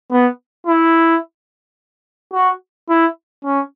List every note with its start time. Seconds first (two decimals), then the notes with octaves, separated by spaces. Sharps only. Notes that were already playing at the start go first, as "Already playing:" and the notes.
0.11 B3
0.67 E4
2.34 F#4
2.89 E4
3.44 C#4